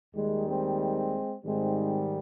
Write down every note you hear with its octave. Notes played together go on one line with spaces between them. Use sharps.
D#2 D#3 G3 G#3
G#3 C4
G#2 D#3 G3 G#3 C4